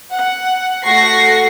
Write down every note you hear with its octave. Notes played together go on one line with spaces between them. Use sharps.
F#5
A3 F#4 C#6 A#6 C7